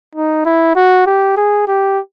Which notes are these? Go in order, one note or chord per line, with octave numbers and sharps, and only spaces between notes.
D#4
E4
F#4
G4
G#4
G4